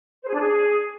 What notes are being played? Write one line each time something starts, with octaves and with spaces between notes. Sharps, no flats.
C5
G#4
D4
G#4